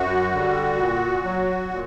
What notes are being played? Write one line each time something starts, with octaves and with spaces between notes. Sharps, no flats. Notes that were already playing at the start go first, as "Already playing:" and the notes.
Already playing: F#2 F#4
D3 G3
A#2
F#3
A#2